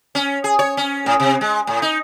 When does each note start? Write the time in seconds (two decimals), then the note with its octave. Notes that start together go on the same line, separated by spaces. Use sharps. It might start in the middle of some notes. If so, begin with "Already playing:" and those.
0.15 C#4
0.44 G#4
0.59 C#5
0.77 C#4
1.06 A2
1.20 C3
1.41 G#3
1.67 A2
1.82 D#4